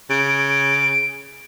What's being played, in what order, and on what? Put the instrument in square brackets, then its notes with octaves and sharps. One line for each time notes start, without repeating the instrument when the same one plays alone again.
[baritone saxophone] C#3 [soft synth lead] D7